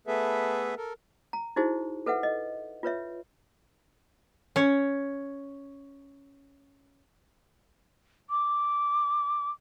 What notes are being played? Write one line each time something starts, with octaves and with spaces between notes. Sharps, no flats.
A3 B3 G#4 A4 B4 E5
A4 A#4
A#5
D#4 E4 F#4 G#4 C5
A4 B4 E5 F#5
D#5
F4 B4 C#5 E5
C#4 C#5
D6